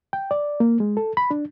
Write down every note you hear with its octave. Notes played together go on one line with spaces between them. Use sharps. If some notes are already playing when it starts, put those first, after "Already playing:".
G5
D5
A#3
G#3
A4
B5
D4